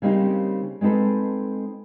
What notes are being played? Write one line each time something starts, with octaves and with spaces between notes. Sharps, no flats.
C#3 G3 A#3 C4 D#4 G4
G#3 C4 D#4 A4 B4